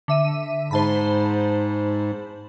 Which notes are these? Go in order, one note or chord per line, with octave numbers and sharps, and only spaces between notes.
D3 E5 D#7
G#2 C5 A5 B5